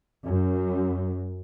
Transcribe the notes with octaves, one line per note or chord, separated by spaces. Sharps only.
F#2